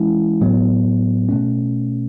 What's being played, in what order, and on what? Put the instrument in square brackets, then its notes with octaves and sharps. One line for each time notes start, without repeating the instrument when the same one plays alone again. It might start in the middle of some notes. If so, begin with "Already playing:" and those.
Already playing: [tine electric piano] E3 G#3 C#4 E4
A2 F#3 B3
B2 A3 C#4